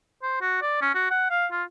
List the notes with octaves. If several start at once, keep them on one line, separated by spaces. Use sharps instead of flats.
C5
F#4
D5
C#4
F#4
F#5
F5
F4